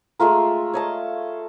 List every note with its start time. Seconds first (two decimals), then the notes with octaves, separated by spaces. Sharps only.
0.19 G#3 A3 F4 A#4
0.73 C#5 D#5 A5